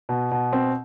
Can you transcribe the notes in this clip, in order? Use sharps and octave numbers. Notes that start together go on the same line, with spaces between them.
B2
B2
C4